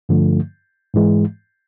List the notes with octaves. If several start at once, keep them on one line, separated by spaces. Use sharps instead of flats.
G2 D3 F3 A3
G#2 E3 G#3